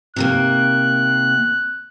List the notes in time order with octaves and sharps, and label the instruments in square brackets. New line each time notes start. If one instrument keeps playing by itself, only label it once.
[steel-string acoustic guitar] C3 D#3 A#3 [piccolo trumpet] F#6